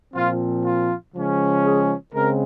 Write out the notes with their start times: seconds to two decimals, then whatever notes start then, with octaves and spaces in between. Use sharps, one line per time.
0.14 A#2 F3 C4 F4
0.64 F4
1.15 C#3 F3 G#3 C#4
1.65 G#4
2.15 C#3 G#3 C4 A#4